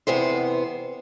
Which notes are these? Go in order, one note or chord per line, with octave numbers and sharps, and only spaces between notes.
E2 C3 B3 C5